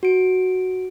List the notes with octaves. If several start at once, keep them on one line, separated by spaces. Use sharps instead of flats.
F#4 D7